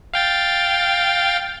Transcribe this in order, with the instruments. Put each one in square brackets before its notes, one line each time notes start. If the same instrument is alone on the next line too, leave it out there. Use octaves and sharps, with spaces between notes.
[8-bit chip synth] F5 G5 A6